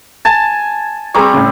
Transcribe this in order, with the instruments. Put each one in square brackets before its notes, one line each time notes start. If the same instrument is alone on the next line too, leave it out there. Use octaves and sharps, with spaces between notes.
[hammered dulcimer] G#5 A5
[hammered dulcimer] G3 C4 [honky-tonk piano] G#4 A#5 C#6
[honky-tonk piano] A2 C#3